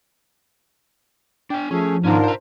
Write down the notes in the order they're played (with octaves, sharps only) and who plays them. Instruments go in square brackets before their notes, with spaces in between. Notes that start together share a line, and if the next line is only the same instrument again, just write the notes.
[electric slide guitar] D4 G#5 [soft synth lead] G5
[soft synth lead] F3 [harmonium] A3 G#4 A4 [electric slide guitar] C#4
[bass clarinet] G#2 [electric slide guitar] D#3 B3 C#4 [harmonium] D4 F4 A#4
[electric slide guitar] C5 A#5